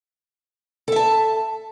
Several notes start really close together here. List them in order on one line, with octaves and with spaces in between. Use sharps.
A4 E5 A5